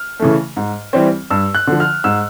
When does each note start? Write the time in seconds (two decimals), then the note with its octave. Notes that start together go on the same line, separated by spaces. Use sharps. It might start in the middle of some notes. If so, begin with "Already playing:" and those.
Already playing: F6
0.20 C#3 E3 A3
0.57 G#2
0.93 E3 G3 C4
1.31 G2 E6
1.55 F#6
1.67 D3 F3
1.80 F6
2.04 G#2 E6